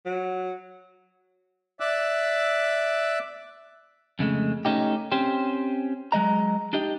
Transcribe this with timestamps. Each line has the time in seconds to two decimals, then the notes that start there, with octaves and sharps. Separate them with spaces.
0.05 F#3
1.80 D5 E5 D6 E6 F#6
4.19 F2 C#3 G#3 A3
4.65 A3 C#4 D#4 G4
5.12 C4 C#4 G4 C5
6.12 F#3 G#3 D#5 A#5
6.73 D4 D#4 G4 D#5